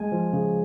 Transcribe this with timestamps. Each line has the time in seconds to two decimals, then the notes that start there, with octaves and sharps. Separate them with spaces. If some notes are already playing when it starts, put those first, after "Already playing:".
Already playing: G#3 G#5
0.12 F3
0.33 C#3